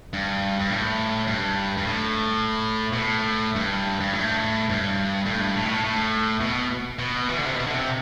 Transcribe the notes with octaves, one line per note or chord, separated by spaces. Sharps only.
G2
G2
A2
G2
G2
A2
B2
A2
G2
G2
A2
G2
A2
G2
A2
B2
A2
A2
B2
B2
E3
D3
C3
B2
D3
C3